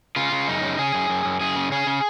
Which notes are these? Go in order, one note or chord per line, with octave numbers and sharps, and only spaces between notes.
C#3 F4
C#3
F#2 D#4
C#3
C#3 G#4
F#2
F#2
F#2
F#2 G#4
C#3
C#3 G#4
C#3